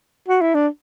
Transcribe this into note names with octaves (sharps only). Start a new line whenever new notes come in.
F#4
E4
D4